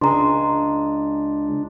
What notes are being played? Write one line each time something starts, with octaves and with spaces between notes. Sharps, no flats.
C#2 G#3 D4 G#4 A#5 C6